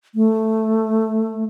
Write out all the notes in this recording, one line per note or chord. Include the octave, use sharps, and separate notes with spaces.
A3